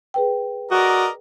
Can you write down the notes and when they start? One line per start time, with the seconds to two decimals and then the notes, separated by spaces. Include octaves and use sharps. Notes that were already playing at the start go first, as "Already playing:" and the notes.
0.14 G#4 B4 G5
0.71 F#4 A#4 D5 D#5